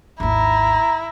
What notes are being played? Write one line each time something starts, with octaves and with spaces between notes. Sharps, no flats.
G#1 D#2 E4 A#5